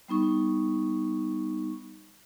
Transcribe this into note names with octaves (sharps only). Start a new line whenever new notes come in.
G3 B3 D#4 C#6